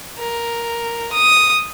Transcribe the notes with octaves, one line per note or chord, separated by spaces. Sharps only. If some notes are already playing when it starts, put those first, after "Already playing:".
A#4
D#6